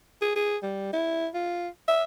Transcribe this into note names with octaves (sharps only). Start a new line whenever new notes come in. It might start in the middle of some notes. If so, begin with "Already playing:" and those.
G#4
G#4
G3
E4
F4
E5